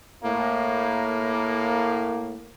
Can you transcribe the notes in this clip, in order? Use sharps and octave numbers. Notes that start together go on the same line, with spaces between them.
A2 A#3